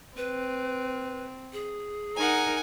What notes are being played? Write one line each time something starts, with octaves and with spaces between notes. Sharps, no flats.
C4 B4
G#4
D#4 A#4 F#5 G#5